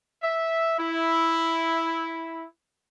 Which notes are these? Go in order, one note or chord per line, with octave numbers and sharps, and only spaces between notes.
E5
E4